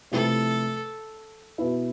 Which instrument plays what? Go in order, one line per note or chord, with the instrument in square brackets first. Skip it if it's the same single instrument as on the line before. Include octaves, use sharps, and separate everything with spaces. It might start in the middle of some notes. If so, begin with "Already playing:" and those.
[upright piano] C3 F3 A3 E4 B4 [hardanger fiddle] A4
[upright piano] B2 B3 E4